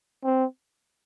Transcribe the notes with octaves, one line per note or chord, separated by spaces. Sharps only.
C4